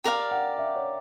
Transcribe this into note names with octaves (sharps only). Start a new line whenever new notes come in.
G4 A#4 D5 F5 G5
F#5
E5
C#5